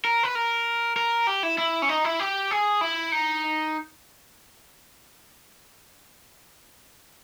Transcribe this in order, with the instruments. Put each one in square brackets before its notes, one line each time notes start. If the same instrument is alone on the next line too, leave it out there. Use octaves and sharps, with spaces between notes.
[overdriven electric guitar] A#4
B4
A#4
A#4
G4
E4
E4
C#4
D#4
E4
G4
G#4
E4
D#4